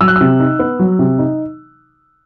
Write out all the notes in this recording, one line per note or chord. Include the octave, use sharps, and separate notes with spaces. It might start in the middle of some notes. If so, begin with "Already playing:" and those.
F#3 E6
F#6
C3 E6
D#4
B3
F#3
C3
D#4